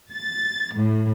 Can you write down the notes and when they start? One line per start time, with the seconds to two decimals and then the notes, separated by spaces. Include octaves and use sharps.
0.11 A6
0.75 A2